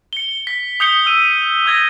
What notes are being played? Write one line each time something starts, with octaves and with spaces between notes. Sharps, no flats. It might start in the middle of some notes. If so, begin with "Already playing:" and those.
C#7 G7
B6
D#6 G6 C#7 G7
E6 D#7
D#6 G6 G#6 A#6 G7